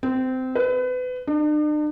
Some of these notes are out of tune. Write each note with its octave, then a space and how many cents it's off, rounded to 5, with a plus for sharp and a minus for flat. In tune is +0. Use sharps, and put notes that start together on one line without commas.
C4 -20
B4 +30
D4 +45